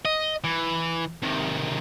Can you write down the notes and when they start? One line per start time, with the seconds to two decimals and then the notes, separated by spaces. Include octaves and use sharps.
0.05 D#5
0.44 E3
1.23 C3 D#3